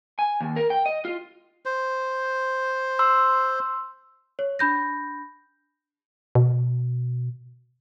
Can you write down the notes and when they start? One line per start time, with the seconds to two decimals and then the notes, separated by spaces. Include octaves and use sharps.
0.19 G#5
0.41 D#2
0.56 A#4
0.70 G5
0.86 D#5
1.05 F4
1.65 C5
2.99 C6 E6
4.39 C#5
4.59 D4 B5 G6 A#6
6.35 B2